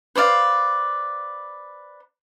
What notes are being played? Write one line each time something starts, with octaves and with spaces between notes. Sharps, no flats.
B4 C5 D5 F5